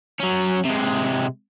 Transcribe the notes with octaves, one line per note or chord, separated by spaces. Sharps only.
F#3 C#4
C3 G#3